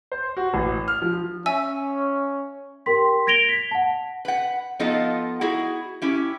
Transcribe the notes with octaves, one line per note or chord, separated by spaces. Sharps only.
C5
F#4
A1
F6
F3
C#4 E5 G#5 E6
G4 A#4 G5 C6 B6
G#6 A#6 D7 F7 G7
B6
F#5 A5
B4 F#5
F3 B3 D#4 F4 A4 D#5
E4 F#4 G#4
C#4 E4 G4